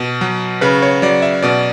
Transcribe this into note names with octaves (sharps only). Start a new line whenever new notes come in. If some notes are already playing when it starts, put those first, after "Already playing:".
Already playing: B2
F#3
C#3 B4
C#5
F#3 D5
E5
B2 D5